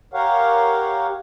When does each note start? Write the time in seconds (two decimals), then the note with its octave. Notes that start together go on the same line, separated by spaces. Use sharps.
0.14 G4 A#4 C#5 F5 F#5